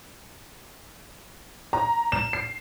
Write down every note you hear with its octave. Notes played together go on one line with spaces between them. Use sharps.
A#5
E7
C7